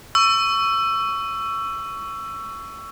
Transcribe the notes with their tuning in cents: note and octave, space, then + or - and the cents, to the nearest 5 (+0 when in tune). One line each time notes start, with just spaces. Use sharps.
C#6 +15 E6 +20